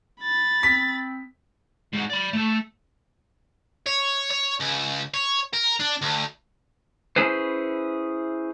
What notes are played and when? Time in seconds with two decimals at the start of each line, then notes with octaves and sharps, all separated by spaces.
0.21 B5 A6
0.63 C4 B6
1.93 G#2 F#4
2.10 D5 B5
2.33 A3 A4
3.86 C#5
4.31 C#5
4.60 C#2
5.14 C#5
5.53 A#4
5.80 D4
6.01 D2
7.16 C#4 E4 G#4 B4 C5